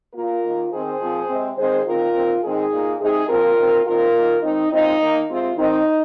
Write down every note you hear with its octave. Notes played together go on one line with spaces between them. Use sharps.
A#2 A#3 F4 A#4
D#3 A#3
D#3 C4 G#4 C5
A#2 F3 C4
C3 G#3 C4
D#3 G#3 C4 G#4 C5
D#3 C4 F4 A#4
D#3 C4
D#3 G#3 C4 D#4 G#4
A#2 A#3
C3 G#3 C4 D#4 G#4
A#2 F3 C4 F4 A#4
D#3 C4
D#3 C4 F4 A#4
D#3 A#3
D#3 G#3 C4 D#4
A#2 G#3 C4 D#4
D#3 A#3
C3 G#3 C4 F4
D#3 C4 D#4